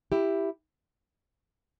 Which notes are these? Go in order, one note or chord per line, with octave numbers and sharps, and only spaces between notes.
E4 G4